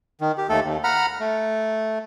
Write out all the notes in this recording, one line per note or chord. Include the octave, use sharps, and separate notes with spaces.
D#3
G4
D#2 A3 A4
D#2
F#5 A#5 B5 F6
A3